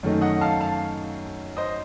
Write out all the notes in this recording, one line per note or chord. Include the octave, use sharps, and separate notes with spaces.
F#2 D#3 A3 D#4
D#5 F#5
F5 A5
F5 A5
C5 D#5